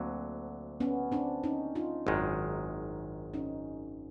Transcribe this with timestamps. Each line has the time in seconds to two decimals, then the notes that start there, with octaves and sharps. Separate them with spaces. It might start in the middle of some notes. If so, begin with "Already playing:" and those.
Already playing: D2 D3 F#3 A#3 C4
0.80 B3 C#4
1.12 C4 D4
1.44 C#4 D#4
1.75 D#4 F4
2.07 G#1 F#2 D#3 G#3
3.34 C#4 D#4